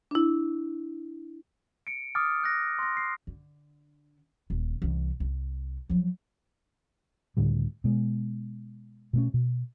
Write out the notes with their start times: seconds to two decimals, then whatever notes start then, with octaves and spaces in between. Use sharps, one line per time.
0.11 D4 E4
1.87 C#7 D7
2.15 D6 D#6 F6 A6
2.44 F#6 A#6
2.79 C6 A#6
2.97 C7
3.27 D3
4.50 D#1
4.82 C2 E3
5.20 C2
5.89 F3 F#3
7.37 C#2 A2 D3 G3
7.84 B2 G#3
9.13 B2 A3 C#4
9.34 B2